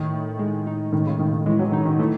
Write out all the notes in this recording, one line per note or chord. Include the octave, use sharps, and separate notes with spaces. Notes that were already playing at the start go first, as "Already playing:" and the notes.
Already playing: A2 D#3
A2
G#3
D#4
A2 D#3
C#3
A2 D#3
D#3
E3 G#3
F#3
D#3 D#4
D#3
E3 A3